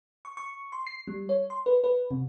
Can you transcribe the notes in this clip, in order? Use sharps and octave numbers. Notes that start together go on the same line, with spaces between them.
C#6
C#6
C6
C7
G3
C#5
C6
B4
B4
C3